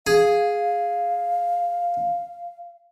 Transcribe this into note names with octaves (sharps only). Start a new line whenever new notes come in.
G#4 F5